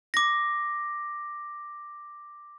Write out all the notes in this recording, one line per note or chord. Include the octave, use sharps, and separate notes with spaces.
D6 A#6